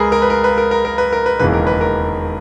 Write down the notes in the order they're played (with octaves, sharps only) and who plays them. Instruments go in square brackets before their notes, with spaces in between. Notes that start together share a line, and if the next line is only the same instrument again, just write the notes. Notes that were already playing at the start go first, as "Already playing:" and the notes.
Already playing: [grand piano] C#2 G#4 A#4 B4
A#4
B4
A#4
B4
A#4
A#4
A#4
B4
A#4
B4
E1 D#2 C#3 E3 B4
A#4
B4
A#4